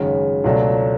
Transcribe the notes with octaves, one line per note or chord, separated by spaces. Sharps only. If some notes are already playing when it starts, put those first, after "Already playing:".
Already playing: G#1 F#2 C#3 G#3 C#4
C#2 B2 F#3 A3 D4